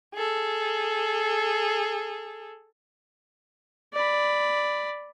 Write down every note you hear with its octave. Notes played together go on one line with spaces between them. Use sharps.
G#4 A4
D5 B5